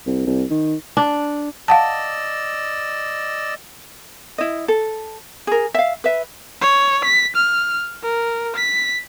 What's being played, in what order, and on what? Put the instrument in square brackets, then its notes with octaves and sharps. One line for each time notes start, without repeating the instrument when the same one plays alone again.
[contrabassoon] C2
C2
D#3
[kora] D4
[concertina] D5 D#5 E6 [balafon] F5 F#5 A5
[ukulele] E4 D#5
A4
G#4 A#4
E5 F5
B4 E5
[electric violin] C#5
B6
F6
A#4
B6